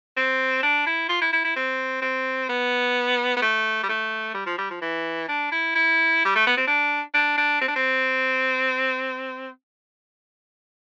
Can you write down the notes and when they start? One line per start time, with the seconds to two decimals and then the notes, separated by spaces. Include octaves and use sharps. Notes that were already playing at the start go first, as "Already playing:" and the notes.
0.17 C4
0.63 D4
0.87 E4
1.09 F4
1.22 E4
1.33 E4
1.45 E4
1.56 C4
2.02 C4
2.49 B3
3.37 B3
3.42 A3
3.83 G3
3.89 A3
4.34 G3
4.46 F3
4.58 G3
4.70 F3
4.81 E3
5.29 D4
5.52 E4
5.75 E4
6.25 G3
6.36 A3
6.47 B3
6.57 C4
6.67 D4
7.14 D4
7.38 D4
7.61 C4
7.68 D4
7.76 C4